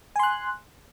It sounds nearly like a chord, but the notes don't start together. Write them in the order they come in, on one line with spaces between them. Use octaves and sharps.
G#5 C6 F#6